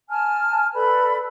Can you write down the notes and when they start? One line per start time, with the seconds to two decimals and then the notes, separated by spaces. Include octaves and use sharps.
0.09 G#5 A5 F6
0.74 A4 B4 D5 B5